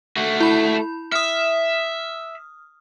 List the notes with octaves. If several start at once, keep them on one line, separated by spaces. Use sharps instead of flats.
A3 F#4
E4 B5
E5 D#6 F6